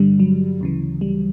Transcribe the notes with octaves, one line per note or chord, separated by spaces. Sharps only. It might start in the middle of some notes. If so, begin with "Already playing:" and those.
Already playing: G2 D3 G3
F#3
D2 C#3 E3
G3